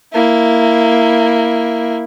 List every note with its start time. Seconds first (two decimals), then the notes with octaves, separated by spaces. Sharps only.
0.13 A#3 E4